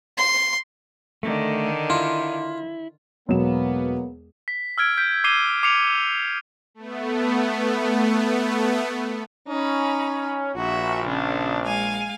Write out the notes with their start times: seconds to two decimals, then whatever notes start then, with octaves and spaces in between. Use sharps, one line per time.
0.18 C6
1.23 D3 D#3 A3
1.90 E4 F4
3.29 E1 B2 F#3 A#3 B3 E7
4.48 B6
4.78 E6 F6 G#6 D7
4.97 G6 B6 D7
5.24 D6 C7 D#7 G7
5.63 D6 C7 C#7 F7
6.75 A3 B3
9.48 C#4 D#4 B5
10.56 A#1 F#4 E5
11.06 C#3 D4
11.65 G#3 F5 G#5